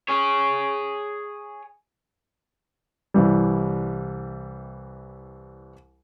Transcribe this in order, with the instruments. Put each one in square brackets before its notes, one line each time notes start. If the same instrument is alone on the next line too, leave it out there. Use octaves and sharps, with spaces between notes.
[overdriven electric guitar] G#4 C#5
[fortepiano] C2 E3 G3